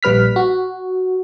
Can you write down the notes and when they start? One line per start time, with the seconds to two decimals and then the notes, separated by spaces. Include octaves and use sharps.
0.03 A#1 G3 B4 F6 B6
0.36 F#4